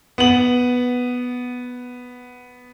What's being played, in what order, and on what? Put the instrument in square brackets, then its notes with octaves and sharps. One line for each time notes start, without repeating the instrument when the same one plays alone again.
[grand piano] B3 F#7